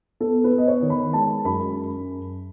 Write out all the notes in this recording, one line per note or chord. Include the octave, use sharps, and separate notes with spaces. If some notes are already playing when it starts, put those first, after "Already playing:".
B3 A4
B4
B3
D#5
C#5
D#3
B5
G#3 A5
F#2 B5